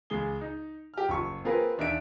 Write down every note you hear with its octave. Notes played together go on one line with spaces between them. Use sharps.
C#2 G#3 G#4 G7
D#4
G4 F6
F#1 F3 C#6
A#3 C4 F4 G#4 A#4 B4
D#2 D4 D#4 E5 D7